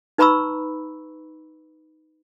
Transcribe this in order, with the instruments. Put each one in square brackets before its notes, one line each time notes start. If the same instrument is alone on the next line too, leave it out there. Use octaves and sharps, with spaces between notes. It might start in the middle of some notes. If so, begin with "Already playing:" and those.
[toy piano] D#4 B4 A#5 B5 C#6 E6